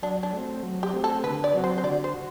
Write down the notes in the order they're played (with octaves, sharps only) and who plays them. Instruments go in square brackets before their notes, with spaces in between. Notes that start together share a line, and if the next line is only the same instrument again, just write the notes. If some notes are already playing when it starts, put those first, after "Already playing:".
[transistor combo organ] F#3 [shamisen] D4
[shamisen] D4
[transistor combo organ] A3 C4
F#3
[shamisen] G4
[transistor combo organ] A3 C4
[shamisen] A4
[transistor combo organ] D3 [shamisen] B4
[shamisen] D5
[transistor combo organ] F#3 C4 F#4
[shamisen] C5
C5
[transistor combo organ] D3 [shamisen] D5
[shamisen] C5
[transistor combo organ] F#4